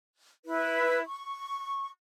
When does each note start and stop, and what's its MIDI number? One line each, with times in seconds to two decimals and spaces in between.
0.45 1.01 64
0.45 1.01 71
1.06 1.90 85